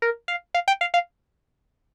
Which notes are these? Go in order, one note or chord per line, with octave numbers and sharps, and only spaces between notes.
A#4
F5
F5
G5
F5
F5